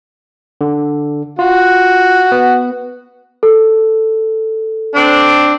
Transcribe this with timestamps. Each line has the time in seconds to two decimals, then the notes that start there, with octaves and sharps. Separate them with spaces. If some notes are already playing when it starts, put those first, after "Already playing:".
0.61 D3
1.39 F4 F#4
2.32 B3
3.43 A4
4.94 C4 D4